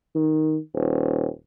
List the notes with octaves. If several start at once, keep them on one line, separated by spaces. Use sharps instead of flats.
D#3
D#1